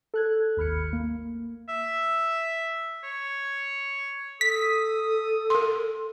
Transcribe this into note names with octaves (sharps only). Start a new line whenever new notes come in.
A4 F#6 G#6
G#1 D#2 B5 F6 G#6 C#7
A#3
E5
C#5
A4 D#6 B6
A#4 C6